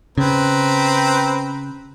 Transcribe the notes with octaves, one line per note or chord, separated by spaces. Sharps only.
C#3 C4 B4 A#5